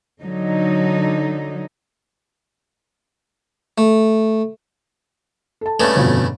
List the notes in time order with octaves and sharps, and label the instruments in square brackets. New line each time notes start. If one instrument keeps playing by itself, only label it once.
[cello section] D3 F#3 D#4
[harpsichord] A3
[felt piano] A4 A5
[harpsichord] G2 C#3 A3
[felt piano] G1 F2 B2